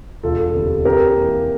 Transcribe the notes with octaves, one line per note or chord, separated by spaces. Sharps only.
E1 F4 A4
D2 C3 G3
F2 G4 A#4
A#3
E3